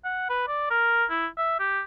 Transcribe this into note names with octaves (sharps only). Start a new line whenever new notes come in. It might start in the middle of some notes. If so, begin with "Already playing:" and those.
F#5
B4
D5
A#4
E4
E5
G4